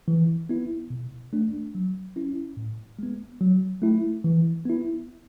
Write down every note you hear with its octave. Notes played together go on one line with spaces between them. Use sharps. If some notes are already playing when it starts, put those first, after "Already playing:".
E3
B3 E4
B2
A3 D4
F#3
C#4 E4
A2
G#3 B3
F#3
A3 E4
E3
B3 E4